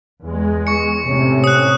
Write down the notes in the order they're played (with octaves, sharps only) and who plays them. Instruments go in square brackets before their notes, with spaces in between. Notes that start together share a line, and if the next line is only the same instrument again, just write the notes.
[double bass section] E2 G#3
[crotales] C#6 C#7
[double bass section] A2 C3 C#4
[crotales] D#6 F#6